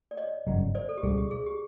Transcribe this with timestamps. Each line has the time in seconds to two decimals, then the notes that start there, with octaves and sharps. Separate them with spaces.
0.11 D5
0.17 C#5 D#5
0.47 G1 F#2 C#3 F#3
0.75 C5 D5
0.89 A4
0.97 G4
1.03 C#2 B2 G3 G#4
1.18 G4
1.31 G#4
1.46 G4